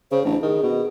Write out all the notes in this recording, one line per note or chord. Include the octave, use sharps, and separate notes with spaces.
C#3 C5
A1 D4
D#3 G#4
B2